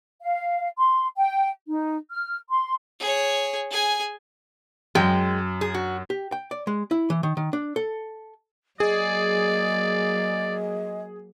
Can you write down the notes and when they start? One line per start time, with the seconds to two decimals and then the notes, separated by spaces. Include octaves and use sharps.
0.21 F5
0.79 C6
1.17 G5
1.68 D#4
2.11 F6
2.50 C6
3.00 G#4 C#5
3.71 G#4 G#5
4.95 F#2 G#3 G5
5.61 G#4
5.74 F#4
6.10 G4
6.32 G5
6.51 D5
6.67 G#3
6.91 E4
7.10 E3
7.23 D#3
7.37 D#3
7.53 D4
7.76 A4
8.80 F#3 A#3 G#4 D5 D#5